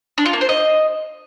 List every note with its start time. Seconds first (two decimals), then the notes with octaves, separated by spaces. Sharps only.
0.18 D4
0.25 F4
0.33 A#3
0.41 C5
0.49 D#5